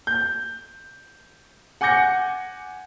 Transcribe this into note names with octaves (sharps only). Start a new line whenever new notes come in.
G6
F#5 G#5 D6 G6 A#6 C#7